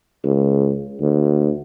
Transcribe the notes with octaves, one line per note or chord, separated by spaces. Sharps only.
C#2
D2